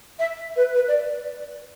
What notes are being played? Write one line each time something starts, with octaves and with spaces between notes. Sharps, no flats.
E5
B4
B4
D5